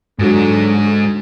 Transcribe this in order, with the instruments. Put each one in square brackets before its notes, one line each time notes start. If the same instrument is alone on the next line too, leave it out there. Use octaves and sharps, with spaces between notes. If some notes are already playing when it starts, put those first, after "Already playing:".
[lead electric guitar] G#2 G#3 [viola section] D3 F#3